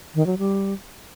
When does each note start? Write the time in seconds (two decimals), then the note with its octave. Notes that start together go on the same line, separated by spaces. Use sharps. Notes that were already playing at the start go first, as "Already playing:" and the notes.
0.15 D#3
0.27 F#3
0.38 G3